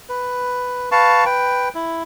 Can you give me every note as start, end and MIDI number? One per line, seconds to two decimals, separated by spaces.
0.09 0.89 71
0.91 1.25 71
0.91 1.25 77
0.91 1.25 81
0.91 1.25 85
1.25 1.69 71
1.25 1.69 79
1.75 2.03 64